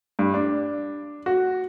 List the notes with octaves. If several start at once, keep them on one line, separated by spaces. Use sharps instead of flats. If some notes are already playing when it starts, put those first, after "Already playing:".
G2
D4
F#4